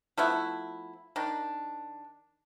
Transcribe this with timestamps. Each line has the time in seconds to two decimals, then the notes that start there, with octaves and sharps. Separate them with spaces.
0.17 F3 A3 B3 E4
1.16 D#3 D4